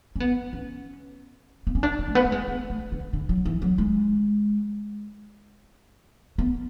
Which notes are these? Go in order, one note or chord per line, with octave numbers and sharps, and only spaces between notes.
C#4
B3
C#4
B3
C#4
D4
C#4
A3
B3
A3
G#3
B3
A3
D3
D3
F#3
E3
F#3
G#3
B3